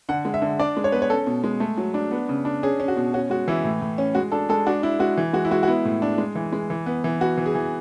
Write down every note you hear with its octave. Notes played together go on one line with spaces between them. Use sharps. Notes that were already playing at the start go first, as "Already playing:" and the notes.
D3 F#5
G#3
E5
D3
D4 D5
G#3
C#5
B3 B4
C#5
C#4 A4
B2
G#3
A3
F#3
D4
B3
C#3
D4
C#4 G#4
C#4
F#4
B2
C#4 F#4
G#3 F#4
E3 E4
A2
A2
C#4
G#3 F#4
D4 A4
G#3 A4
D4 F#4
D4 E4
G#3 F#4
E3
G#3 F#4
E4
G#3 F#4
F#4
B3 E4
A2
D4
G#3
E3
G#3
E3
B3
E3
B3 F#4
E3
G#4
E3